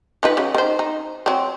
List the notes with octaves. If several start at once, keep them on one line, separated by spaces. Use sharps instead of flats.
F3 D#4 B4
C#3 F#3
D#3 C5
D#4
F#3 C4